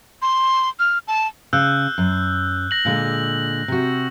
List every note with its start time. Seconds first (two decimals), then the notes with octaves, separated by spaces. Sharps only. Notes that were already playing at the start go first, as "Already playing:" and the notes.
0.22 C6
0.79 F6
1.08 A5
1.53 C#3 E6 F#6 G6
1.98 F#2
2.71 A#6 F#7
2.85 A#2 D3 G#3
3.68 C3 F#4